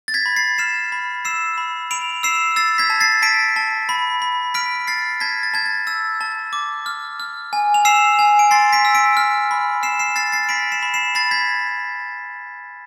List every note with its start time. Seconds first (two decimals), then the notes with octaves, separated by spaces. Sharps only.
0.08 A6
0.14 G#6 B6
0.26 B5
0.36 A6 C7
0.58 F6 C7 E7
0.92 B5
1.25 E6 C7 E7
1.58 B5
1.91 B5 D7 F7
2.23 E6 C7 E7
2.56 E6 A6 C7
2.78 G#6 B6
2.90 A5
3.00 A6 C7
3.22 A5 B6 D7
3.56 A5
3.89 B5
4.22 B5
4.54 F6 B6 D7
4.87 F6 A6 C7
5.20 A5 G#6 B6
5.43 A6
5.54 A5 G#6
5.66 A6
5.87 E6 A6
6.21 A5
6.53 D6
6.86 F6
7.20 F6
7.53 G#5
7.74 F7
7.85 E6 C7 E7
8.19 G#5
8.39 D7
8.51 C6 A6 C7
8.73 B6 D7
8.85 E6
8.95 B6 D7
9.17 F6
9.51 B5
9.83 F6 C7 E7
9.99 C7 E7
10.16 F6 A6 C7
10.32 A6 C7
10.49 B5 B6 D7
10.72 C7 E7
10.82 B5
10.94 C7 E7
11.15 B5 A6 C7
11.31 G#6 B6